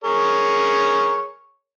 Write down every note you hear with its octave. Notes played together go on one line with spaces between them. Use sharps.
G#4 A#4 C#5